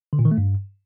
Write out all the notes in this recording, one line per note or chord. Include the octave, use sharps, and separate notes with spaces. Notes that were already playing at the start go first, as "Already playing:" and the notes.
D3
A#2
D#3
A3
G2